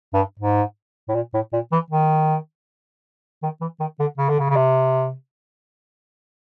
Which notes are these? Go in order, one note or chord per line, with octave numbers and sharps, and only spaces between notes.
G2
G#2
A2
A#2
A2
A#2
E3
D#3
D#3
E3
D#3
D3
C#3
D3
C#3
C#3
C3